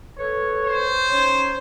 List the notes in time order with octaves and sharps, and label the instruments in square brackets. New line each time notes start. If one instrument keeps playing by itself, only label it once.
[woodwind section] A4 B4 C#5
[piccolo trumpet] C5
[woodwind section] C#4 D#4 C#5